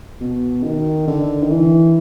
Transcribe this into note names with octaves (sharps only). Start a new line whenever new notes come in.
B2
D#3
D3
D#3
E3